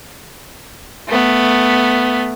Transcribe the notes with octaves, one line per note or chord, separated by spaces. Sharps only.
A3 B3